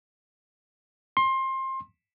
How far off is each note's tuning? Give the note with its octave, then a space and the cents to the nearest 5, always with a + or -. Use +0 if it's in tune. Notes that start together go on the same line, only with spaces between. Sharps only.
C6 +25